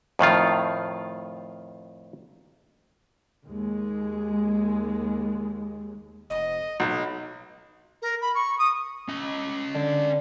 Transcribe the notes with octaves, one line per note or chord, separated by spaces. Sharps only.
F2 A2 D#3 F4
D#2 G#3
F1 D#5
B1 D#4
A#4
B5
C#6
D#6
C#4 D#5
D3